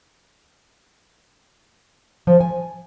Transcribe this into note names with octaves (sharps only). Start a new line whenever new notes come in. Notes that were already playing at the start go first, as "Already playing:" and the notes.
F3
G#5